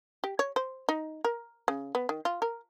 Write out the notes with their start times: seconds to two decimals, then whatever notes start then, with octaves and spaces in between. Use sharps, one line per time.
0.24 G4
0.39 C#5
0.56 C5
0.89 D#4
1.24 A#4
1.68 C#3
1.95 B3
2.09 D#3
2.25 F4
2.42 A#4